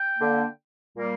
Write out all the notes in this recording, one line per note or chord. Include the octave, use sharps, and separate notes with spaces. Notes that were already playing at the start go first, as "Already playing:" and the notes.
Already playing: G5
D3 A#3
A#2 G3 A#3